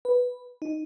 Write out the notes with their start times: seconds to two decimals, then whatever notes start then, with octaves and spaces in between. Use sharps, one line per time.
0.05 B4
0.62 D#4